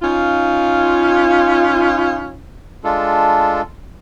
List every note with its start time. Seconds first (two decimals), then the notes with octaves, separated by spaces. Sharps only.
0.02 C#4 D#4 F4
2.84 G#3 D4 F4 A4